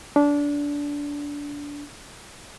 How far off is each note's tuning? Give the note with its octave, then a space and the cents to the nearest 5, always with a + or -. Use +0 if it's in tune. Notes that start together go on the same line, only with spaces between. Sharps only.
D4 -20